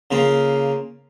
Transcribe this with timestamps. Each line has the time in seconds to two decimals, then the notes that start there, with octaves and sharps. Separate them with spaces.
0.11 C#3 A#3 F4